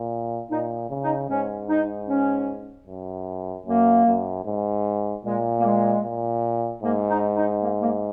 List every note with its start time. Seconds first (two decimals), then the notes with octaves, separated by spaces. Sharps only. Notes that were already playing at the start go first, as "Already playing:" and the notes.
Already playing: A#2
0.50 A#2 D#4
0.90 C#3
1.03 D#4
1.29 G#2 C#4
1.69 D#4
2.08 C#4
2.87 F#2
3.67 F#2 A#3
4.07 F#2
4.45 G#2
5.25 A#2 G#3
5.60 A#3
5.65 G#3
6.04 A#2
6.83 G#2 A#3
7.10 D#4
7.36 D#4
7.62 A#3
7.82 A#3